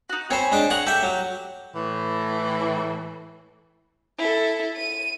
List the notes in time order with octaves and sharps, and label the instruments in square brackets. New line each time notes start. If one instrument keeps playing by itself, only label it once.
[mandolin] D#4 F#4
[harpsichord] C4 C5 [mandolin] C#5 G#5 B5
[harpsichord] G#3 D4 G5
[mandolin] G#4 F#5 [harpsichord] A#5 C#6
[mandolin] G4 [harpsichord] A4 E5
[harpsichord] F#3
[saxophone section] A2 E3
[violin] E4 A4
D#7